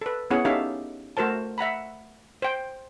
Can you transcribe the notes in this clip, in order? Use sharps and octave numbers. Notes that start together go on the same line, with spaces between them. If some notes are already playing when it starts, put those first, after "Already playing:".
A4 B4
B3 C#4 E4 G#4 C#5 F#5
C#4 D#4 G4 A4 E5 F5
A3 F#4 A#4 C5 A5
E5 F#5 A#5 B5
C5 G5